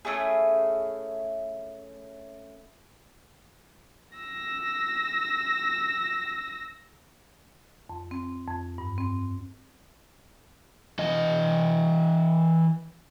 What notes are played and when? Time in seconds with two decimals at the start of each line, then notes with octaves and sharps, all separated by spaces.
0.05 A3 C#4 E4 G#4
4.17 E6 A#6
7.89 F2
8.11 C4
8.48 F2
8.78 G2
8.98 C4
10.99 E3 D#5